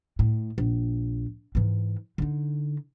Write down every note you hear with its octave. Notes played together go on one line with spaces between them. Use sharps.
A2
A#1
G#2 E3
D3 D#4